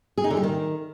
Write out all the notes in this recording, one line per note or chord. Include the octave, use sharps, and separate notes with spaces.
G#4
D#4
D3
G3
D#3